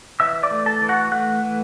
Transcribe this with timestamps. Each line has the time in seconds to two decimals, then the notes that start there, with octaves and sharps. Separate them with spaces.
0.20 E3 E5 E6
0.43 D5 D6
0.51 A3
0.66 A4 A5
0.82 E3
0.89 F#4 F#5
1.12 A3 F#5 F#6
1.43 E3